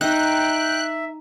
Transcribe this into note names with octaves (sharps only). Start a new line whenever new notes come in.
D#4 E5 G5 F#6